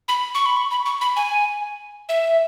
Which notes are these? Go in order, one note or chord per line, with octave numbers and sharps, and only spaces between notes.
B5
C#6
B5
C#6
B5
C#6
B5
G#5
E5